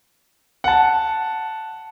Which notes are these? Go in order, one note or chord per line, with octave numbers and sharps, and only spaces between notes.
F#5 A5